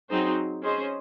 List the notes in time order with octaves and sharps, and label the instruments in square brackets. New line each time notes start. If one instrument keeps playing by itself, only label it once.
[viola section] F#3 C4 D#4 G#4 C5
C#4 G#4 C5 D#5